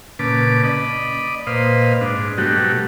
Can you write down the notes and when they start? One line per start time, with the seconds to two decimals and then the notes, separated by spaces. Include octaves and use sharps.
0.19 A#2 C#3 B4 A5 D6
0.64 D5 D#5 B5
1.47 A#2 B4 C5 D#5 F5
2.01 G#2 D4
2.38 B2 F#3 G3 A3 F#4 G4